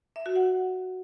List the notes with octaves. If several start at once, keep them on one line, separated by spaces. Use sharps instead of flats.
E5
F#4
F#5